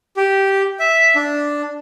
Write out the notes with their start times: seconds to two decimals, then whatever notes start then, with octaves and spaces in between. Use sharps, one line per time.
0.17 G4
0.80 E5
1.15 D4